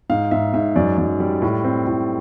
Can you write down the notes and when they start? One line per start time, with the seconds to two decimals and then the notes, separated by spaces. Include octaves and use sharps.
0.10 G#2 F5
0.31 G#2 E5
0.53 G#2 E5
0.76 F#2 D5
0.98 F#2
1.20 G3
1.42 A2
1.64 C4
1.87 A2